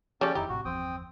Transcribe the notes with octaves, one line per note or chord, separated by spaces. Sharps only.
C#3 F3 C#4 G4 A4 D5 G5
E1 F2 D#3 D#4 E4 G4
A#1 A2 C3 F#4
G1 E2 F3 C4 G5 D#6